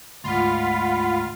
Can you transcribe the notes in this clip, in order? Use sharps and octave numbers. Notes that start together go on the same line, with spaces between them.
D2 G#2 F4 F#5 B5